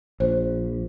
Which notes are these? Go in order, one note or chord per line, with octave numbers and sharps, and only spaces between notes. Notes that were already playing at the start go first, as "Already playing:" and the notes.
A#1 C5